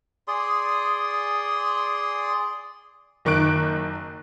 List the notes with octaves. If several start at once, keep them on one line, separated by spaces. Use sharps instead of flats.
G#4 D5 C6 D#6
F#1 D#3 C#6 D6 F#6 D7